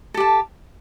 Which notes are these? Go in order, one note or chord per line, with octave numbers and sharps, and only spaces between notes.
G4 A4 A5